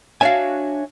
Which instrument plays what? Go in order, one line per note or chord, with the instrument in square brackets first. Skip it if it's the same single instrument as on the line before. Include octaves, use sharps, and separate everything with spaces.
[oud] D4 F#4 F5 [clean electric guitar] C#5 E5 G#5